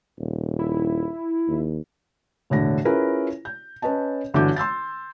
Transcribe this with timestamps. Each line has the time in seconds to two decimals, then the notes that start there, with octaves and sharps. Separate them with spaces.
0.19 D#1
0.59 E4
1.48 D#2
2.50 E1 A2 D3 A#6
2.85 C#4 E4 F4 G#4 A#4 B4
3.45 G6
3.82 C#4 B4 C#5 D#5 A5
4.34 G1 D3 E3 F#4 D6 G6
4.56 C6 E6 G6 A6